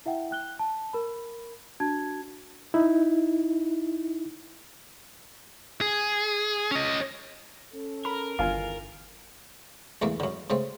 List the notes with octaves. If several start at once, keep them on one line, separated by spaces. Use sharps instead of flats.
E4 E5 F#5 G5
G5 F#6 G7
A5
A#4 B5
D4 F#4 A5 G#6
D#4 E4
G#4
C#4 D#5
C#4 A4
A#4 B5
G1 E2 D#3 F4 G#5
B1 E2 A3 A#3
F#2 D3
C#3 A3 C4